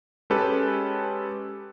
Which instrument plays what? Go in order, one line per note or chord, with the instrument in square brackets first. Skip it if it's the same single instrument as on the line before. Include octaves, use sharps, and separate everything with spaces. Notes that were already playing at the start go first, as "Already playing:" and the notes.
[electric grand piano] G#3 C#4 G4 A4 B4